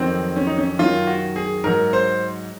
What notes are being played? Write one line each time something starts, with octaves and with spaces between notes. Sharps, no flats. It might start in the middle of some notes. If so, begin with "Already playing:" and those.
Already playing: F2 D#3 F#3 C4
C#4
D#4
C#4
F#2 D#3 F#3 F4
F#4
G#4
G#2 F#3 A#4
C5